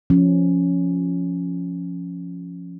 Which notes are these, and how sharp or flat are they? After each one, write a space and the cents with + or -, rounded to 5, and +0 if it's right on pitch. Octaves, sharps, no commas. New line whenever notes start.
F3 +0 C#4 +0